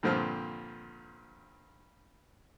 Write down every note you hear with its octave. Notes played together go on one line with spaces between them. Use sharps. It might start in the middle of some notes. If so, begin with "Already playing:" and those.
G2 A#2 D3 F3 C4 F6